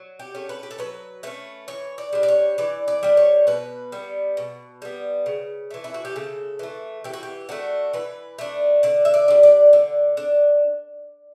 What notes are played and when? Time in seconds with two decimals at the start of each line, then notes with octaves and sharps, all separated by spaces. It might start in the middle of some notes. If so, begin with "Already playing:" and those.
Already playing: F#3
0.19 G4
0.35 A3 C#4
0.49 B4
0.63 G4
0.71 A4
0.78 F#3 B4
1.23 A3 C#4 B4
1.68 E3 C#5
1.98 D5
2.13 G3 D4
2.23 D5
2.28 C#5
2.58 E3 D5
2.88 D5
3.03 G3 D4
3.17 C#5
3.47 B2 B4
3.92 G3 B3
4.37 B2
4.82 G3 B3
5.26 C#3
5.70 E3 A3
5.84 E4
5.94 F#4
6.05 G4
6.16 C#3 A4
6.59 E3 A3
7.04 E3 G4
7.13 F#4
7.23 G4
7.49 A3 D4 F#4
7.93 E3 B4
8.38 A3 D4
8.83 D3 D5
9.05 E5
9.14 D5
9.28 G3 D4
9.43 D5
9.73 D3
10.17 D4